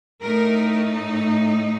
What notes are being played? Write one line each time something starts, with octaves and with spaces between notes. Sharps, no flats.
A2 A3 D#4 A#4